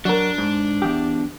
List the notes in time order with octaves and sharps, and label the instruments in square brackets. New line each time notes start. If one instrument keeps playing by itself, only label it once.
[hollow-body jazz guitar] F#3 A#4 [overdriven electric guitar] D4
[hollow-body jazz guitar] G#2
E2 G4